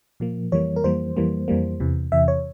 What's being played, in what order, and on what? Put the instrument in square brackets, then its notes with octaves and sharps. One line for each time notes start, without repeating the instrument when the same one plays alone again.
[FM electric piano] A#2 F3 A#3
F2 E3 G3 A#3 C#5
A#4
F2 E3 G3 A#3 C5
F2 E3 G3 A#3
F2 E3 G3 A#3
E2 C3 E3
E2 C3 E3 E5
C#5